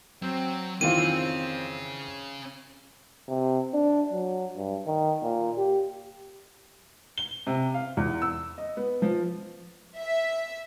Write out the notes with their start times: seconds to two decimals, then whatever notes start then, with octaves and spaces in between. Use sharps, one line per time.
0.22 F#3 C4
0.81 F2 D#3 E3 C4 C#4 F4 G#4 D#7
3.28 C3
3.74 D4
4.12 F#3
4.57 G2
4.86 D#3
5.23 A#2
5.58 G4
7.18 G7
7.47 C3
7.74 F5
7.97 E2
8.22 E6
8.58 D#5
8.77 B3
9.02 F3
9.98 E5